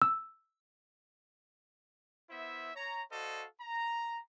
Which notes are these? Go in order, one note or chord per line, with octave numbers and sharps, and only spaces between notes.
E6
B3 E4 C5 E5
C#5 A#5
F#4 A4 C5 D5 D#5 F5
A#5